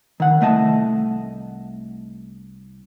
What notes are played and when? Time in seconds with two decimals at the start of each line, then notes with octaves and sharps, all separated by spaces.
0.20 D#3 F#5
0.41 C2 A3 D#5 A5